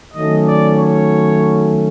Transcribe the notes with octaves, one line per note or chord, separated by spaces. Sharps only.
D#3 F#3 A3 C#4 D#5
D5
C#5